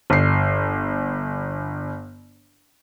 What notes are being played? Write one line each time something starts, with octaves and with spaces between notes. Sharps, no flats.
G1 C7